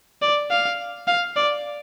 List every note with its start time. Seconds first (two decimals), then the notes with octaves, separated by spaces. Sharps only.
0.22 D5
0.51 F5
1.07 F5
1.36 D5